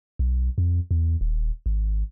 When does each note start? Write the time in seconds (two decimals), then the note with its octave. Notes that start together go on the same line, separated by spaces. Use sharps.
0.19 B1
0.58 F2
0.91 E2
1.21 D#1
1.66 G#1